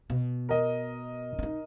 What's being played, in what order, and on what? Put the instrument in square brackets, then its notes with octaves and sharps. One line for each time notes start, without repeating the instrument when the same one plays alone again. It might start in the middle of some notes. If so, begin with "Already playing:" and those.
[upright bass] B2
[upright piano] A#4 D#5
[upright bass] D4 D#4